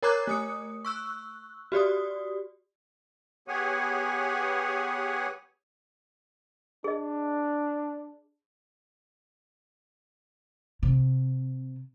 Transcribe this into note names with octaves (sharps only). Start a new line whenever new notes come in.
A#4 C#5 A#5 D6 F#6 G#6
A3 D#6 C#7
C#6 E6 F#6
F#4 G4 D5 D#6
B3 G4 G#4 C#5 F#5 G#5
D4 G#4 D#5
C3